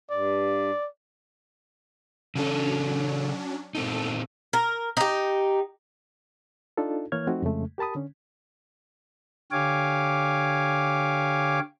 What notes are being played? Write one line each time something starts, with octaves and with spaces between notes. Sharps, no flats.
G2 D5
C#3 F#3 C#4 D4 A4
A#2 C4 D#4 A4
A#4
D#4 G4
D4 D#4 F4 A4
E3 A#3 C#5 F6 G#6
F3 A3 C4 D#4 F#4
F2 C#3 G#3 A3
G4 A#4 A5 B5 D#6
D3 C#4
D3 G4 C#5 F5 G#5 D6